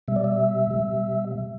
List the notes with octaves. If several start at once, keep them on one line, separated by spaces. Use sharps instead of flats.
B2 G3 E5
D5
E5
B2 G3